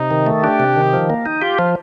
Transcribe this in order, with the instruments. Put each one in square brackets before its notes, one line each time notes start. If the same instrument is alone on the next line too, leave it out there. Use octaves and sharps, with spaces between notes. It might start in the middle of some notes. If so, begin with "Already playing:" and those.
Already playing: [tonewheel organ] C3 [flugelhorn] D#4
[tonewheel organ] D#3
A3
[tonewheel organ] D4 [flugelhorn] G4
[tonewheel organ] C3
D#3
F3
A#3
D#4
[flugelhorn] F4 [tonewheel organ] G4
[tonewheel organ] F3